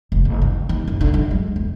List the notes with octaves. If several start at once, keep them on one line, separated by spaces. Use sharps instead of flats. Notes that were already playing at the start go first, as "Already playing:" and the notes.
F1
F#1
D#3
D#2
F#2
D3
F#2
G#3
E2